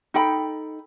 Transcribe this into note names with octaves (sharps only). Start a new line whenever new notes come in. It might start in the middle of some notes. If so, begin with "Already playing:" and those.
D#4 A4 G5 B5